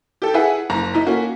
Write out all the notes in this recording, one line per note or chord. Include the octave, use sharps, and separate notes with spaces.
G4 A4
E4 G#4 B4 E5 F#5
F#1 A#5
D#4 E4 B6
A#3 C#4 F#4